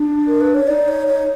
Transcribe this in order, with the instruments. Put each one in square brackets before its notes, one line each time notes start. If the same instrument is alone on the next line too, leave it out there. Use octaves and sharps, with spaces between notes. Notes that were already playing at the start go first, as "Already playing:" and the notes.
Already playing: [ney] D4
[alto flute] A#4
B4
C#5
[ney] D#4 [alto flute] D5
[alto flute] C#5
C#5